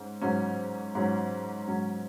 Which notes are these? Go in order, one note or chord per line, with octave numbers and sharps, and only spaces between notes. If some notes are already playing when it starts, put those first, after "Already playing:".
Already playing: G#2 C#4
G#2 F#3 C#4
G#2 F#3 C#4
G#2 F#3 C#4